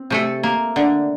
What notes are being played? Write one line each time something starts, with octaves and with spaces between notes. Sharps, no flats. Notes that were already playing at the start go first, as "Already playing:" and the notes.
Already playing: C4
C3 A3 A4
A#3
D3